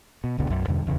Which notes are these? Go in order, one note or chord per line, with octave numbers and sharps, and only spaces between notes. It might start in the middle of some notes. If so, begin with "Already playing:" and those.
B2
F1 C#2 B2 D3
B1 F#2
E2 G2 B2 D3
D1 E2 C#3